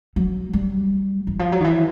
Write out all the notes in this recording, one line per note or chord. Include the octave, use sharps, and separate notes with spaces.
F#3
G3
E3
F3
F#3
D#3
E3